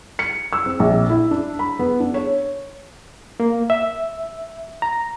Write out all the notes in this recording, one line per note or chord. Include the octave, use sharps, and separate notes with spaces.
C#7
E6
C4
A#1
E4
D4
B5
B3
D4
C#5
A#3
E5
A#5